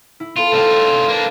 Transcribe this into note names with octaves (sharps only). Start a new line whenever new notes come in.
E4
B3 F4 A4
A3 F4 C5 D5 G5
G6
A#3 D4 B4